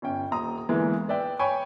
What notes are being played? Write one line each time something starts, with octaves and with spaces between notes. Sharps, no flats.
G1 C#4 G5
D#1 A#5 D#6
D2 E3 G#3 A#3 B3
B4 D5 E5 G5
C#5 G5 G#5 B5 C#6